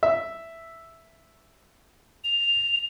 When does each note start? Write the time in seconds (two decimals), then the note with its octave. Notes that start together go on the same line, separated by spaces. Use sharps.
0.03 E5
2.24 F7